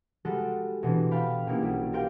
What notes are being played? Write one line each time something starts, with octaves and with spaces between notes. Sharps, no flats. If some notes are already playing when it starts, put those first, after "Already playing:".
G3 G#3 F#4 A4
B2 E3 C4 D4
F5 G5 A5 B5
B2 A#3 C#4 D#4 E4 G4
B1 G3
G4 A#4 C5 D5 F5 G5